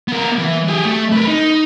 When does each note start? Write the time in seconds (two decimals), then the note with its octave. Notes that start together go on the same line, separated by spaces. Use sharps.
0.08 B3 A#4
0.38 E3
0.68 G4 G#4
0.85 A3
1.12 A#4 B4
1.27 D#4